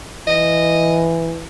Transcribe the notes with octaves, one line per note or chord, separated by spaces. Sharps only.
E3 D#5